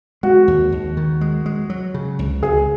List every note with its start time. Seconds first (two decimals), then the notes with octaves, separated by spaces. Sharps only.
0.23 G#3 F#4
0.48 D#2
0.72 D#2
0.97 D#3
1.21 G#3
1.46 G#3
1.70 F#3
1.94 C#3
2.19 C#2
2.43 C#2 G#4